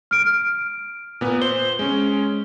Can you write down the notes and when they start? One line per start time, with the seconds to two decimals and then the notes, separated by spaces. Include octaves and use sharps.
0.11 F6 D7
1.21 A#2 B3
1.42 C5 G7
1.79 G#3 C#4